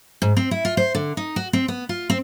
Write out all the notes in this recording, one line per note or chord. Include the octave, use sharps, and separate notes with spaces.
G#2
C4
E4
F4
C5
D3
D#4
F#4
C4
B3
F4
C4